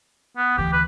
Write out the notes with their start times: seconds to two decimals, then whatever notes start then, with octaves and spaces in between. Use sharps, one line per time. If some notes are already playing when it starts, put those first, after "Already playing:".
0.37 B3
0.58 D2 E3 G4
0.73 B4